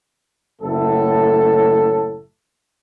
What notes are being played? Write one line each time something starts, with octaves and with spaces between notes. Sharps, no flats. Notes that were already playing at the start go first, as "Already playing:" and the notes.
F#1 A2 F#3 A3 A4